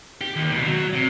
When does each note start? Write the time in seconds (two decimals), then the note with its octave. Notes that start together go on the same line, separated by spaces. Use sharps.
0.21 G4
0.36 D#2
0.51 C#2 B2
0.65 F#3
0.93 C3